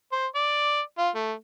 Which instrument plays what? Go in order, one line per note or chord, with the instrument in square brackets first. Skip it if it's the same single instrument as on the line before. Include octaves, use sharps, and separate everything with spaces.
[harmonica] C5
D5
F4
A3